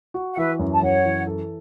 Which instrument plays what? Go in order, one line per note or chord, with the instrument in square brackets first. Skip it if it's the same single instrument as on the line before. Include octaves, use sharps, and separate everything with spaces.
[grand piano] F#4
[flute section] F#5
[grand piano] E3 [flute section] B4 E5
[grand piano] F#2
[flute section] A5
[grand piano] F#2 [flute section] C#5 F#5
[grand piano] E3
A4